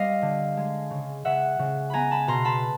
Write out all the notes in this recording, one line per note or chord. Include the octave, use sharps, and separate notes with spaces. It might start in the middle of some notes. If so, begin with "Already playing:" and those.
Already playing: G3 C4 D#5 F5
D3
G#3
C#3
C#3 E5 F#5
C#3
B3 G#5 A#5 B5
A5 B5
B2 A#5 C6
A5 B5